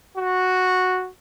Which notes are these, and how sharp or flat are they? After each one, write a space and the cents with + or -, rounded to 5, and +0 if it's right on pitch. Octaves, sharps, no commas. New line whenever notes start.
F#4 -5